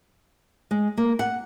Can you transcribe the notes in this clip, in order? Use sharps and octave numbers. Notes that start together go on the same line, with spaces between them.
G#3
A#3
F#5